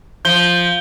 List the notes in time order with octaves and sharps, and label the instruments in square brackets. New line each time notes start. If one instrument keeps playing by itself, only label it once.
[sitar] F3 [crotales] G6 G7